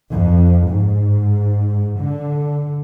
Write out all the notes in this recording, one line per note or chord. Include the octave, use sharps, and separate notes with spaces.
F2
G#2
D3